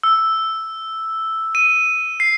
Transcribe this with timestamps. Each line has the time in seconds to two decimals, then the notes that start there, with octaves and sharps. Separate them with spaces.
0.03 E6
1.55 D#7
2.20 C7